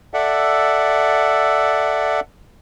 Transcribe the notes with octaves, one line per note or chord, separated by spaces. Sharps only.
A4 D5 E5 F#5